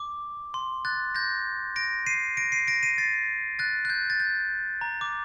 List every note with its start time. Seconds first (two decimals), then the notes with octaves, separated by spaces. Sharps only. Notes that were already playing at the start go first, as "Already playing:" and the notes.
Already playing: D6
0.54 C6
0.85 F#6 A6
1.15 G6 A#6
1.76 A#6 D7
2.06 C7 D#7
2.37 A#6 D7
2.52 C7 D#7
2.67 A#6 D7
2.83 C7 D#7
2.98 A6 C7
3.59 F#6 A6
3.85 F#6
3.90 G6
4.10 A6
4.20 G6
4.81 A#5
5.01 D6